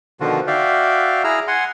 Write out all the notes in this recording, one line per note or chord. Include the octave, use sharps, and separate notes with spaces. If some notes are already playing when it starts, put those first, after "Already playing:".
B2 D3 D#3 F3 F4 F#4
F#4 D5 E5 F5 G5
E4 G#4 A#5 E6 F6
F#5 G#5 C6